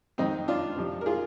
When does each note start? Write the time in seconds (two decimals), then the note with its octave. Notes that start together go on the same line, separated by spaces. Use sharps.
0.18 F2 D#3 C4 D#4
0.48 D4 F4
0.76 F2 C3 F3
1.01 A#4
1.06 F4 G#4